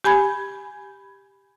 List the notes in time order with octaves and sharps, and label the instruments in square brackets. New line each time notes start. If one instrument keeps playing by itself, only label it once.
[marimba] G4 G#5 B5 G#6